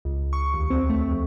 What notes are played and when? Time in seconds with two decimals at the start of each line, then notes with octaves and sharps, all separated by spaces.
0.05 C#2
0.33 C#6
0.54 D#2
0.70 C4
0.90 A3
1.09 F2